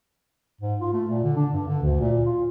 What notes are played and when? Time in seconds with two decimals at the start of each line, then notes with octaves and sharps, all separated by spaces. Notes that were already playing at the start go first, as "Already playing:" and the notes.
0.61 G#2
0.81 F4
0.93 A3
1.10 A#2
1.24 D3
1.36 D4
1.53 G2
1.67 D3
1.82 D2
2.00 A#2
2.26 F4